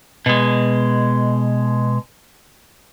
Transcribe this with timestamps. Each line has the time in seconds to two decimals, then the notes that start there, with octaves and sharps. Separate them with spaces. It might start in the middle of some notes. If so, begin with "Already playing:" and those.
0.26 B2 G#3